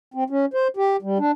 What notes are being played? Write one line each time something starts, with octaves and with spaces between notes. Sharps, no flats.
C4
C#4
C5
G4
G3
D4